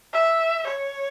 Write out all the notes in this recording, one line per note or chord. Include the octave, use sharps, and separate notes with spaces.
E5
C#5